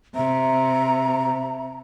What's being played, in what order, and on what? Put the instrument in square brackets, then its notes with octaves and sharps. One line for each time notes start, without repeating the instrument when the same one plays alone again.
[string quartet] C3 [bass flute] E5 [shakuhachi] A#5